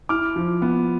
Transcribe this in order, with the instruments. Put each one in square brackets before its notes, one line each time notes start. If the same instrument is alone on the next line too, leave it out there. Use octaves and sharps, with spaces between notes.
[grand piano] E4 D6 F6
F3
B3